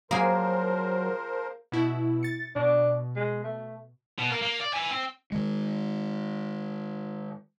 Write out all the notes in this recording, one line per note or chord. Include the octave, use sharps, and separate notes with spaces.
F3 F#3 A#3 G#4 A#4 C5
B2 E4
A6 C#7
B2 D4
G#3
A3
B2
A#3 A#4
A#3
D5
E5 G#5
C4
D#3 G#3